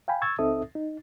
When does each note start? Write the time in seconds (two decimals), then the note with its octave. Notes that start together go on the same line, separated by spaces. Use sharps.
0.08 F5 G5 G#5 B5
0.22 C#6 E6 G#6 A6
0.39 C#2 C4 D#4 A4 E5 D#6
0.75 D#4